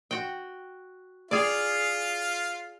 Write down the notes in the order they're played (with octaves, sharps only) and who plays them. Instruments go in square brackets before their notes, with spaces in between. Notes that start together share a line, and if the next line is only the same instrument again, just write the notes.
[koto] F#4 G5
[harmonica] F4 F5 [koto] G#4 D5